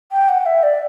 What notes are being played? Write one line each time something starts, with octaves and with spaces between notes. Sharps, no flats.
G5
F#5
E5
D5